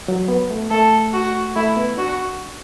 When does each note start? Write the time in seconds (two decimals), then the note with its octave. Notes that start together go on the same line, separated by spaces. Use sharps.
0.08 F#3
0.28 B3
0.51 A3
0.71 A3 A4
1.13 F#4
1.56 A3 E4
1.77 B3
1.97 D4 F#4